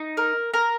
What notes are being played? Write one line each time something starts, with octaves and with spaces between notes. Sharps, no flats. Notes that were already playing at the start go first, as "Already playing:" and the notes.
Already playing: D#4
A#4
A#4